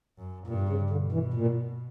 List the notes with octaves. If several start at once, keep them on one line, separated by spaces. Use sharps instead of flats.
F#2
G2 A#2
C#3
B2 D3
E3
A#2